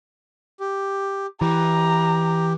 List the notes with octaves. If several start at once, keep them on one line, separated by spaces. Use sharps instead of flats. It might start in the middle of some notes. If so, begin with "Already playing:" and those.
G4
E3 G4 A#5